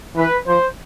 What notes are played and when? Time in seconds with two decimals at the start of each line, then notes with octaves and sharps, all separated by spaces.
0.16 E3 B4
0.47 F3 C5